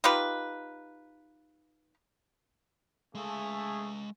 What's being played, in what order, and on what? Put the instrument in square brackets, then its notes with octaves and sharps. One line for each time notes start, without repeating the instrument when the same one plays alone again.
[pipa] D#4 F4 G4 B4
[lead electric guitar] G#3 F5 [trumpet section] A3 G#4